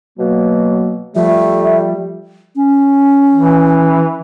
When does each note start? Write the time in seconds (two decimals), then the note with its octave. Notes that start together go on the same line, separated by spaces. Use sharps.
0.19 B2 F#3 A#3
1.15 F3 G3 A3 E5
2.56 C#4
3.35 E3